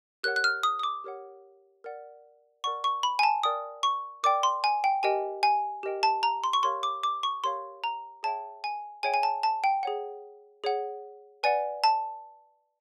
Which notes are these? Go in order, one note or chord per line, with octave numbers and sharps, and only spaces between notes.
G4 A#4 C#5 F#5 F#6
F#6
F6
D#6
D#6
D6
G4 A#4 C#5 F#5
A#4 D5 F#5
A#4 D5 F#5 C#6
C#6
B5
G#5
A5
A#4 D5 G5 D#6
C#6
A#4 D5 G5 D6
C6
G#5
G5
G4 A#4 D#5 G5 G#5
G#5
G4 A#4 D#5 G5
A5
A#5
C6
C#6
G4 A#4 C#5 F5 C6
D6
D6
C#6
G4 A#4 C#5 F5 C6
A#5
G#4 C#5 E5 G5 A5
G#5
G#4 C#5 E5 G5 G#5
G#5
A5
A5
G5
G#4 C#5 F#5
G#4 C#5 F#5
B4 D5 F#5 G#5
A5